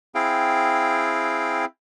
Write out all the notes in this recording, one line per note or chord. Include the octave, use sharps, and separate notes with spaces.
C4 E4 G#4 F5 G5